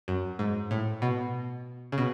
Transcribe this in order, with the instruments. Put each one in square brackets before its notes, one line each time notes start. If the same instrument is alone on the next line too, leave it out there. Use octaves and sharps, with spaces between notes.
[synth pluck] F#2
G#2
A2
B2
C#3
B2